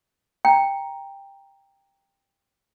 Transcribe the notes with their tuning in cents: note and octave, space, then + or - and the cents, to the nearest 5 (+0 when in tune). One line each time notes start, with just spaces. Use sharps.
G5 +10 A#5 +0